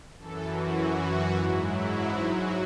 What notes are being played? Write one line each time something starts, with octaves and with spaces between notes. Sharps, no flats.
F#2 E3 A4
F#4
F#4
G#2 F#3 E4
E4
F#4